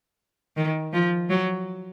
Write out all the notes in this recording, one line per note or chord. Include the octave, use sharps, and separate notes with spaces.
D#3
F3
F#3